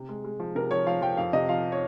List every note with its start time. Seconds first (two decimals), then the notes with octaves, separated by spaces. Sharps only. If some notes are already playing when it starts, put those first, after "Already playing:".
Already playing: C3
0.09 G#3
0.24 G#3
0.40 F3
0.55 C3 A#4
0.71 F3 C#5
0.86 F3 F5
1.02 F3 G5
1.17 F2 F5
1.33 C3 D#5
1.49 F3 F5
1.72 C#5